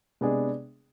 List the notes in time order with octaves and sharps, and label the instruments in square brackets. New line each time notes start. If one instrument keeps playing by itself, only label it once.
[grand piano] C3 G#3 B3 D4 G#4